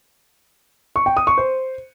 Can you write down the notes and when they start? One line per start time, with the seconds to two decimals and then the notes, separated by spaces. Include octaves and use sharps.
0.96 C#6
1.06 G5
1.17 D#6
1.27 C#6
1.38 C5